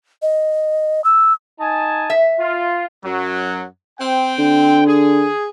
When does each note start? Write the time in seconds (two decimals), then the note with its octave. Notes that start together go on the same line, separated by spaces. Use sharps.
0.22 D#5
1.04 E6
1.59 D#4 G#5 A5
2.10 E5
2.39 F4
3.03 F#2 F#3
3.99 C4 G5
4.38 D3
4.86 G#4